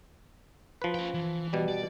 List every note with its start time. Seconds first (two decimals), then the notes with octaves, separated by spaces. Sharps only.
0.82 F3 B4
0.94 C#4 G5
1.14 E3
1.53 B2 G3
1.69 D5